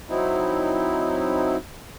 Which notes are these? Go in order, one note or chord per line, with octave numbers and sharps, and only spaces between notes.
F#3 C4 D#4 E4